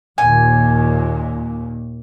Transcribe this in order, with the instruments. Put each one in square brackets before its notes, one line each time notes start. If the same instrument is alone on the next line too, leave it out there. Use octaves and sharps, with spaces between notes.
[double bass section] D#2 A#2 [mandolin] G#5